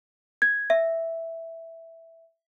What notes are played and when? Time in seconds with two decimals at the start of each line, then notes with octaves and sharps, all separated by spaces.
0.42 G#6
0.70 E5